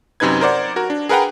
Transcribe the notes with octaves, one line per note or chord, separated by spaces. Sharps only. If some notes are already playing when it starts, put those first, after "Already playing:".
F#2 C3 D#4 B4 G#6
A#4 C5 D5 F#5
F#4 A#4
D4
G#4 A#4 B4 F#5 G5 A#5